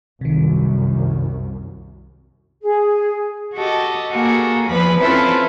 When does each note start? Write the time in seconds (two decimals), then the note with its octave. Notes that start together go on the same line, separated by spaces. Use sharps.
0.21 C2 F#2 C3 D#3
2.63 G#4
3.57 F#4 G4 A4 D#5
4.12 A#3 F#4 G#4 A4
4.69 E2 F3 B4 B5
5.00 C4 C#4 E4 F4 A4 B4